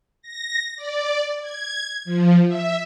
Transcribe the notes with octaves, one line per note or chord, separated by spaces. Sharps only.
A#6
D5
G#6
F3
E5